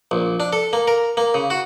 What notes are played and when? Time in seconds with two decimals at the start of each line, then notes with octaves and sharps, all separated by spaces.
0.11 A#1
0.40 D4
0.53 A4
0.73 A#3
0.88 A#4
1.17 A#3
1.34 C#3
1.50 F#4